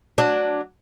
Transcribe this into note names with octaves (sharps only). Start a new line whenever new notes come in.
F#3 D4